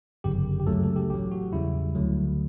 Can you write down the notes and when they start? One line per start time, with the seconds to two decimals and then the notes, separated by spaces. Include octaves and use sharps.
0.24 G1 F#2 C#3 G4
0.60 G4
0.67 C#2 C#3 F#3 A3 A4
0.84 A4
0.96 G4
1.09 A1 A2 F#3 G4
1.31 F#4
1.53 E2 C#3 G3 E4
1.95 D2 D3 F#3 A3